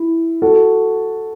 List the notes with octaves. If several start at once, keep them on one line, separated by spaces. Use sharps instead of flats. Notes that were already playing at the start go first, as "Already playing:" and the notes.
Already playing: E4
F#4 A4